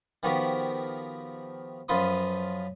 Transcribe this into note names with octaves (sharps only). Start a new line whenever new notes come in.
D#3 F3 B3 F#4 G4 A#4
F#2 F3 F4 B4 C6 D#6